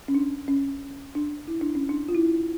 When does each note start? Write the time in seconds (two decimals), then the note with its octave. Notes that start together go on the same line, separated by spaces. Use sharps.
0.08 C#4
0.15 D4
0.48 C#4
1.15 D4
1.48 E4
1.61 D4
1.75 C#4
1.89 D4
2.09 F4
2.15 E4